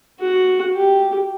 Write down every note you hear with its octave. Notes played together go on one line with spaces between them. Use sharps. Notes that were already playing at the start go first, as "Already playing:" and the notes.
F#4
G4